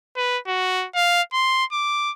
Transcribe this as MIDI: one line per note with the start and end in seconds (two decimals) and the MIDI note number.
0.17 0.38 71
0.47 0.86 66
0.95 1.22 77
1.33 1.65 84
1.72 2.12 86